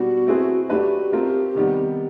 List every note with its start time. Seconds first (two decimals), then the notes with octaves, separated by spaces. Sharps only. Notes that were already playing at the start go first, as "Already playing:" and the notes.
Already playing: B2 G3 B3 D4 F#4
0.27 A3 C4 E4 G#4 B4
0.70 F#3 A3 D4 F#4 G4 B4
1.12 A3 C4 F4 A#4
1.55 C3 D#3 G3 B3